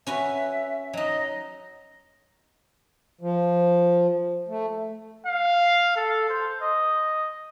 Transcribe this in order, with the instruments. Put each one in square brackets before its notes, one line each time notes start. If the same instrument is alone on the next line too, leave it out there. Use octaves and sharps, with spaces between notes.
[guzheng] C#4 F#4 B4 [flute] E5
[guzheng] F#3 D#4 [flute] D#5
[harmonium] F3
A3
[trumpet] F5
A4
C5
D#5